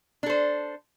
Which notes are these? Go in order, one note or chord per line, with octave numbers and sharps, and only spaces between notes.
D4 A4 C5